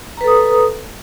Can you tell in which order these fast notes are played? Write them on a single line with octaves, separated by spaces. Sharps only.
A#5 B4 A4 D#6